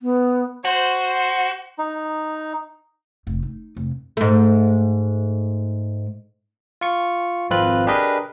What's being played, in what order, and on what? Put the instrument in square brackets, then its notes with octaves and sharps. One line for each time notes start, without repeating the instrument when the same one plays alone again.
[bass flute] B3
[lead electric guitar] F#4 [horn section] C5
[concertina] D#4
[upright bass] F1
D#4
F1
[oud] G#2 A3
[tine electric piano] F4 C#6 C#7
G#1 F2 C4 F4 B4 F#6
D4 G4 G#4 A#4 B4 D#5